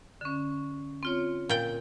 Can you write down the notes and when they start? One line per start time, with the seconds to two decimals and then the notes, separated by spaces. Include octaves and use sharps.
0.21 D3 C#4
1.03 C4 F4 C#5
1.49 A#2 G5